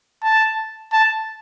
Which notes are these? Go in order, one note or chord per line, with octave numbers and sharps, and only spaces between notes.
A5
A5